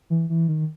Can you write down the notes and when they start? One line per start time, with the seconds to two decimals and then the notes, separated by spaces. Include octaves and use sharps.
0.10 E3
0.30 E3
0.49 D#3